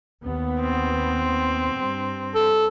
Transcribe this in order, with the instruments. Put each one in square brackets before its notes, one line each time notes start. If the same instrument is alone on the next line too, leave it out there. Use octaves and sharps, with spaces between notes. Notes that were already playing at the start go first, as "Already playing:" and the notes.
[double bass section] D#2 B3
[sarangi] C4
[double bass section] G2
[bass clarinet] A4